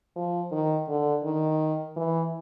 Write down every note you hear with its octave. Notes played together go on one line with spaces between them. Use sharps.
F3
D#3
D3
D#3
E3